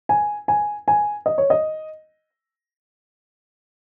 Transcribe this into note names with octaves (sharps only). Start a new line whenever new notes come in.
G#5
G#5
G#5
D#5
C#5
D#5